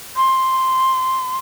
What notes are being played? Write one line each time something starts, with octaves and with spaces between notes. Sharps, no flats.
C6